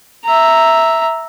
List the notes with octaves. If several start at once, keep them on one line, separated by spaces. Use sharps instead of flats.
E5 A#5